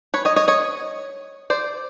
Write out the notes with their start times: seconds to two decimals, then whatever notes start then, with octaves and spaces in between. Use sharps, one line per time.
0.14 B4 C#5
0.25 C#5 D#5
0.36 C#5 D#5
0.48 C#5 D#5
1.50 C5 D5